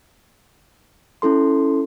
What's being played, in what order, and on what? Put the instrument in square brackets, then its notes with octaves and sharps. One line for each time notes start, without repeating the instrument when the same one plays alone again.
[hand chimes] C#4 E4 A4 C6